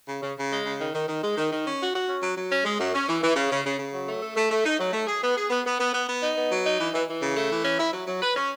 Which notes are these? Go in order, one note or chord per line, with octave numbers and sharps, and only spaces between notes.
C#3
C#3
C#3
G#3
C#3
D#3
D#3
D#3
G#3
D#3
D#3
C#4
F#4
F#4
C#4
F#3
F#3
C#4
G#3
F#2
C#4
E3
E3
C#3
C#3
C#3
C#3
F#3
A3
A4
A3
A3
D#4
F#3
A3
G#4
B3
G#4
B3
B3
B3
B3
B3
D#4
B3
F#3
D#4
E3
E3
E3
C#3
A3
E3
C#4
E4
F#3
F#3
B4
C#4